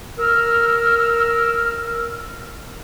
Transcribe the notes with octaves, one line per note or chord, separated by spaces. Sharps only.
A#4 E6 F6